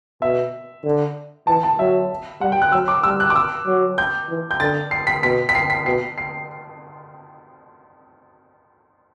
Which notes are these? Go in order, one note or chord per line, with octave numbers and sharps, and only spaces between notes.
B2 E5
D3
E3 A5
A5
F#3 E5
G3 F#5
G5
F#6
F#3 E6
D6
G3 E6
F#6
D6
E6
F#3
G6
E3
G6
D3 A6
C7
B6
B2 B6
B6
C7
B6
B2 C7
C7